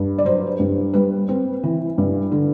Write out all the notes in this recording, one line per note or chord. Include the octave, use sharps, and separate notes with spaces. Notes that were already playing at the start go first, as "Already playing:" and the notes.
Already playing: G2
D5
F#3 C5
G2
G3 B4
C4
E3
G2
D3